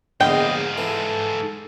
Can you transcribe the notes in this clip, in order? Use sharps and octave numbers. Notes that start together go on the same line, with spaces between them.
A#1 E2 G#2 D3 D#5 F5 G5
E3 A4